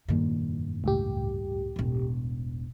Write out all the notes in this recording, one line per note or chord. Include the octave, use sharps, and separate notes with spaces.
F1 G2 A#2 D#3 A#3
C#2 A2 G4
E1 A1